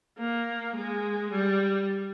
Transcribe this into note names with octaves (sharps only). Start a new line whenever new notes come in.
A#3
G#3
G3